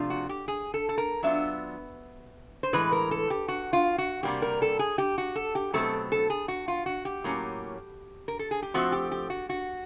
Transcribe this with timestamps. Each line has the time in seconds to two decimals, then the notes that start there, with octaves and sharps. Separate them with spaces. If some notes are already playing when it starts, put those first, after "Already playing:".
Already playing: C3 F3 A3 D4 F4
0.10 F#4
0.29 G4
0.48 G#4
0.74 A4
0.89 A4
0.98 A#4
1.23 F#3 B3 D4 F4 E5
2.63 C5
2.73 A2 E3 G#3 B4
2.92 A#4
3.11 A4
3.30 G4
3.48 F#4
3.73 F4
3.98 F#4
4.23 C3 E3 G3 A#3 G4
4.42 A#4
4.62 A4
4.79 G#4
4.98 G4
5.18 F#4
5.36 A4
5.55 G4
5.73 B2 F#3 A3 C4 A4
6.12 A4
6.30 G#4
6.48 F#4
6.68 F4
6.86 F#4
7.05 G4
7.24 A2 F#3 A#3 C#4
8.28 A#4
8.39 A4
8.51 G#4
8.62 G4
8.74 F3 A3 C4 F#4
8.92 G4
9.11 G4
9.30 F#4
9.49 F#4